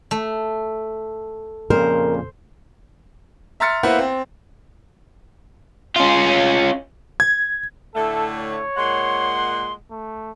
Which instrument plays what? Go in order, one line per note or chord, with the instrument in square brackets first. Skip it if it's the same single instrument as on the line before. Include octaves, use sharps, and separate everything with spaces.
[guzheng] A3
[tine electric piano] F2 A#2 C#3 [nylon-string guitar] A#4 [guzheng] C5
[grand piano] E5 A#5 C6 F6 A6 C#7
A#3 B3 E4 B4 C5 F#5
C4
[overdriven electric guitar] C#4 F4
[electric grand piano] G#6
[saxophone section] A2 D3 A3 [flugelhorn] A4
[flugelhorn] C#5
[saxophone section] A#2 G#3 F#5 [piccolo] C6
[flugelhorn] A3